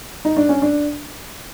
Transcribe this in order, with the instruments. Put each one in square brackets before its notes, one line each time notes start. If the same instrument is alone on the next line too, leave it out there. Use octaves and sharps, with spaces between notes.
[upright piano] D#4
D4
C#4
D4